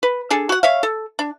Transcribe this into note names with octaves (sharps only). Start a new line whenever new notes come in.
B4
D4 G#4 A4
F#4 F#5
C#5 E5 F5
A4
D4